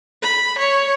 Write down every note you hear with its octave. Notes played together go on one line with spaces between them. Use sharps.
B5
C#5